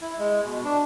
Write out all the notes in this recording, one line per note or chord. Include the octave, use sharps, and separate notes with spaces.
E4
G#3
B2
D4